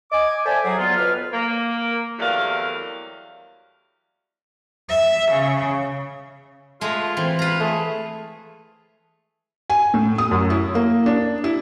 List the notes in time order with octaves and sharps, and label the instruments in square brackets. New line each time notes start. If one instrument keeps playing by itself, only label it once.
[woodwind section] D#5 G#5 D6
A4 C5 D5 E5 G5 G#5
F#3 G#4
D2 D3 F#3 B3 F4
F2 B4 F6
[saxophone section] A#3
E2 F#3 G3 A3 A#4 F5
[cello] E5
C#3
[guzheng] G#3 B4 A#5 [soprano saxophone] A3 [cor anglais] F4
[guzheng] E3 [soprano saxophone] C4
[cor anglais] F4 [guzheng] B4 A#5
[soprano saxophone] A3 [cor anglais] G#4
[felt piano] G#5
A2
D#6
F#2
E4
A#3
D4
E4